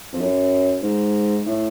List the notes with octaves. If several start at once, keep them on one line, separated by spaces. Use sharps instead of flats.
F2
F#2
G#2
A2